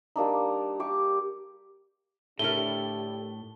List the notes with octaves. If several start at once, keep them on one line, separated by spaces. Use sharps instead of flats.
G3 A#3 D4 D#4
G4 C#6 D6
A2 D3 A3 D4 E4 G4 A#4 G7